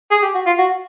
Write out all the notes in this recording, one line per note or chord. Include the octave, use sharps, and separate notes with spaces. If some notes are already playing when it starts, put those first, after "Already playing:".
G#4
G4
F#4
F4
F#4